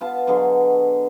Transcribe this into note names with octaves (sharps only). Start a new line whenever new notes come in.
B3 F4 A5
B2 D3 F#3 G#4